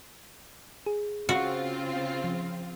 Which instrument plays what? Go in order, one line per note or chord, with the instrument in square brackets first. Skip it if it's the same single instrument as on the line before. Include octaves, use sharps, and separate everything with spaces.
[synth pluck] G#4
[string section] C#3 C4 F4 [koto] F#4
[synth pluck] F3